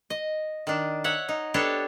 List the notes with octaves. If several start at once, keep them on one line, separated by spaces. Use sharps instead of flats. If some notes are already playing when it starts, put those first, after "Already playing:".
D#5
D#3 D4
C#5 E5 F#5
D#4
B3 D4 G4 A4 C#5